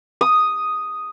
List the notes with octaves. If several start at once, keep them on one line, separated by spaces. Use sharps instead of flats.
D#6